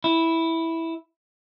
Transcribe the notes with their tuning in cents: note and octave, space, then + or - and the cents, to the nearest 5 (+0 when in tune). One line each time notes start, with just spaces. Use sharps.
E4 -5